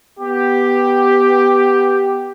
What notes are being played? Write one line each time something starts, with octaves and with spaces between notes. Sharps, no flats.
B3 G4